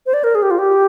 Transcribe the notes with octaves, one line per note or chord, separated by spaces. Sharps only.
C5
D5
A#4
G#4
G4
F4
G4